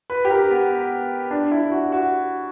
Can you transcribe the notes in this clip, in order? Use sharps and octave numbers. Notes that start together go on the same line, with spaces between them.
B4
G4
A#4
B3
B3
D4
E4
F#4
F#4